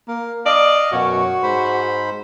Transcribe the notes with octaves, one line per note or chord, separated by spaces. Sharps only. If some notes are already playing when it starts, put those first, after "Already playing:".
A#3
D5 D#5 F5
F#2 B2 F#4 C#5
G#2 C5 B5